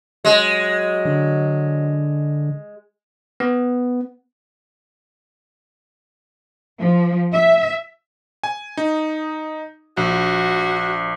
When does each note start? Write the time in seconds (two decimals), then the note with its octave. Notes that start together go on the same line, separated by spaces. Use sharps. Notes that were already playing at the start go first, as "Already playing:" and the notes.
0.25 F#3 G#3
1.05 D3
3.40 B3
6.79 F3
7.33 E5
8.44 G#5
8.77 D#4
9.97 A#1 F#4